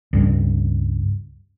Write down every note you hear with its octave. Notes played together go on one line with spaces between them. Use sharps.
C#2 G2